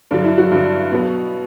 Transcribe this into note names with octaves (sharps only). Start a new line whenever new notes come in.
G2 D3 F#3 D4
E4
F#3 F#4
G2 D3 F#3
B2 F#3 B3